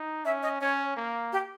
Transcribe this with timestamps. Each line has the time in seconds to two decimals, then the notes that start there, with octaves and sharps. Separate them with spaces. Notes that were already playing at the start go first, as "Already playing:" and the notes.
Already playing: D#4
0.25 C#4 E5
0.43 D#5
0.61 C#4 C#5
0.97 A#3
1.33 G4